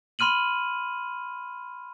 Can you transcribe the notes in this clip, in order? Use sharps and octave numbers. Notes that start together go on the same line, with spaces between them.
B5 C6 F6 D#7 F#7